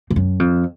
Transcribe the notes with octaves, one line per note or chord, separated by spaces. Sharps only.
G#2
F#2
F2